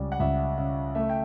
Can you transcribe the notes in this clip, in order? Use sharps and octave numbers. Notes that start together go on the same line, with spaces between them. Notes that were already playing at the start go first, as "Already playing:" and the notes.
Already playing: C#2 G3 D5
F#5
C#2 E5
C#3 E5
A3 E5
G5